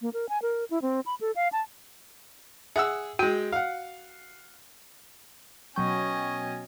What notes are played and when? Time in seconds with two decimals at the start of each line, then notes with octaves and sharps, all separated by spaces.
0.02 A#3
0.13 A#4
0.29 G#5
0.42 A#4
0.71 E4
0.82 C4
1.06 B5
1.21 A4
1.36 F5
1.52 A5
2.76 G#4 E5 F#5 E6
3.19 G#3 F#4 G5
3.52 F5 F#5
5.76 B2 F#3 C#4 D#5 G5 G#5 C#6